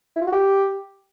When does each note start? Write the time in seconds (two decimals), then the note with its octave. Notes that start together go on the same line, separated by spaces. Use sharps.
0.16 E4
0.21 F4
0.27 F#4
0.32 G4